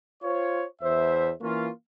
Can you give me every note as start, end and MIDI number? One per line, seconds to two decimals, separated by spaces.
0.23 0.64 65
0.23 0.64 72
0.23 0.64 73
0.82 1.31 40
0.82 1.31 72
0.82 1.31 76
1.41 1.69 52
1.41 1.69 58
1.41 1.69 61
1.41 1.69 65